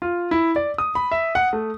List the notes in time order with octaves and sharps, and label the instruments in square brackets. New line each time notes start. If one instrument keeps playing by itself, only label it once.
[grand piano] F4
E4
D5
D#6
B5
E5
F#5
A3